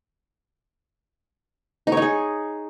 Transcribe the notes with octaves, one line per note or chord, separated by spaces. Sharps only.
D#4
C#5
D#4
G#4